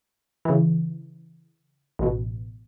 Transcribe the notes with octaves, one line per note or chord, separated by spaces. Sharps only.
C#3 E3
A1 B2